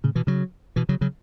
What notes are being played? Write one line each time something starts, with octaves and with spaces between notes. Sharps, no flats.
A2 C#3
B2 E3
C#3 F#3
B2 E3
C#3 F#3
C#3 F#3